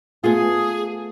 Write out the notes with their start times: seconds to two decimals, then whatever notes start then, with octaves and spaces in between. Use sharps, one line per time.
0.24 A3 B3 F4 G#4